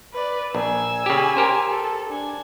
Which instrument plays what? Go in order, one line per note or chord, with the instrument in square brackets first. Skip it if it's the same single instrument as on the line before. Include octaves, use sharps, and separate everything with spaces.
[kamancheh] B4 D5
[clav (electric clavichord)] A#1 [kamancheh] G#5 E6
[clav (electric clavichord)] C#3 G4
G4 A#4 C5
[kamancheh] A4
D4 G#5